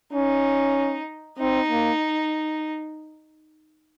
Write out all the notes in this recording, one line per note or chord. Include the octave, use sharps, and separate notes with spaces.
C#4 D#4
C4 D#4
A#3